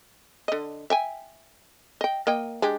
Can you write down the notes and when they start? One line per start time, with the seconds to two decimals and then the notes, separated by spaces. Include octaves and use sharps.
0.48 D3 D#5
0.90 E5 G5 G#5
2.01 D#5 G5
2.27 A#3 D#5 G5
2.62 G#3 D4 G4